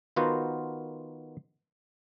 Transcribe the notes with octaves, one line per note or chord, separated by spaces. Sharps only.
D#3 B3 F4 F#4 A#4 C5